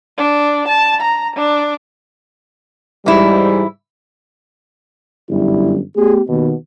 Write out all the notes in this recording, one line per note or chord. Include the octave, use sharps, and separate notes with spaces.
D4
A5
A#5
D4
G#2 E3 G3 E4
G1 F#2 G3 E4
A3 B3 G4 G#4
D#2 B2